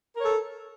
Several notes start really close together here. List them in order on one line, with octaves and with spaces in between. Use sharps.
A#4 C#5 A4